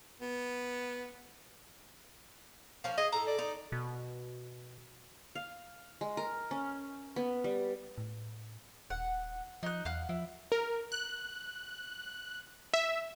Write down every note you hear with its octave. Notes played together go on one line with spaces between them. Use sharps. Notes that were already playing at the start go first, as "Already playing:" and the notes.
B3
F3 A#3 C#4
G#4 D#5
A2 A4 A#5
D5
D#4
B2
F5
G#3
A#4
C#4
B3
G3
A2
D#1 F#5
F3 D#4 F#6
E2 F5 F#5 F#6
F3 E4
A#4
F#6
E5